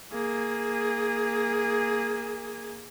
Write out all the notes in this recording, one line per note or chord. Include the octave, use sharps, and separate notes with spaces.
A#3 G#4